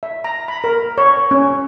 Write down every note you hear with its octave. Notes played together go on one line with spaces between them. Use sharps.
E5
A#5
B5
A#4
C#5
C#4